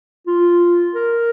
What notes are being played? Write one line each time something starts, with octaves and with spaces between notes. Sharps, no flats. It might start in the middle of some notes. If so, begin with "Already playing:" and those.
F4
A#4